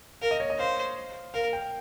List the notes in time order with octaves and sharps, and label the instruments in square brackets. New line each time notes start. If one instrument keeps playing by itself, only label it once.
[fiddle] A#4 [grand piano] F5
[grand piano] D#5
C#5
D#5
[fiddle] C5 [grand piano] F5
[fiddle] A#4 [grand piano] F5
[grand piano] G5